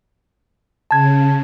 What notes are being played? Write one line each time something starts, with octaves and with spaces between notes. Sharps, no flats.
C#3 A5 G#6